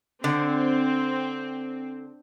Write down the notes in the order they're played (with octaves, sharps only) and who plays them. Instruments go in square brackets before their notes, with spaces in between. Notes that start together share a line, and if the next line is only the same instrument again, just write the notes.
[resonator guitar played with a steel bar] D3 [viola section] C4